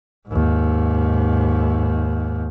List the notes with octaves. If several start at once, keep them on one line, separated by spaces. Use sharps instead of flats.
D#2 G#2